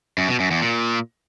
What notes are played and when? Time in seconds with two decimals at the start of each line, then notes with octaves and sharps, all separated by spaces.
0.18 F#2
0.29 B2
0.40 F#2
0.51 E2
0.62 A#2